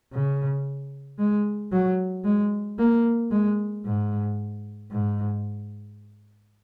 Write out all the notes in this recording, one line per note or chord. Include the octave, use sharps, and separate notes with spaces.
C#3
G#3
F#3
G#3
A#3
G#3
G#2
G#2